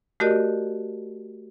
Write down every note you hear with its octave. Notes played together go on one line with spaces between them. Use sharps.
A3 F#4 G4 A#4 D5 D#5